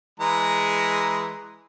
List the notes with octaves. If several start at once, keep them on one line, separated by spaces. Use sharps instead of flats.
E3 G#3 A#5